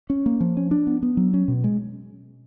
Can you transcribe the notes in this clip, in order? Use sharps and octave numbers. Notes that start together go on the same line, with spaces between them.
C#4
A#3
F3
C#4
D4
B3
B3
F#3
C#4
B2
G#3